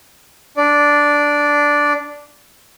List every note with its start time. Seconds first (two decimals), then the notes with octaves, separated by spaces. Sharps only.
0.57 D4 D5